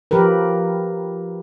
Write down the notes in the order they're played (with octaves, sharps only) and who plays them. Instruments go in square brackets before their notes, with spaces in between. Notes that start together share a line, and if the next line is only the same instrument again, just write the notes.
[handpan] F3 G4 A#4 B4